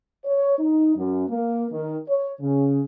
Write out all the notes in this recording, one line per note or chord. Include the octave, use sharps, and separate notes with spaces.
C#5
D#4
F#2
A#3
D#3
C#5
C#3